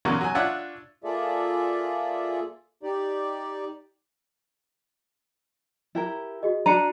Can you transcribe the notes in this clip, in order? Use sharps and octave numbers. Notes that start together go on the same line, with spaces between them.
E2 C#3 F#3 G#3 A#3 C#4
F#3 G#5
D4 F4 C#5 E5 F#5
A#3 F4 G#4 A4 D5 E5
D#4 G4 D5
E4 G4 A#4
F#4 G#4 D#5
D4 F#4 A#5 C#7 D#7